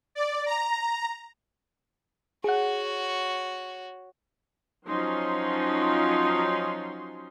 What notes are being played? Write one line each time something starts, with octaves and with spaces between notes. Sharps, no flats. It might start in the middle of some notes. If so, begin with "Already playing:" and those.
D5
A#5
F#4 G#4 C#5 F#5
F3 F#3 C#4 D#4 C6